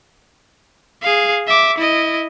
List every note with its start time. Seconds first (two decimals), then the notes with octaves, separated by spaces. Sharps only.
1.02 G#4 F5
1.47 E5 D6
1.78 E4 D#5